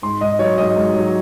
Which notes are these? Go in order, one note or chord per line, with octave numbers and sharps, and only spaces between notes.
G#2 C6
G#2 D#5
F#3 C#5
G#2 D#5
G#2
F#3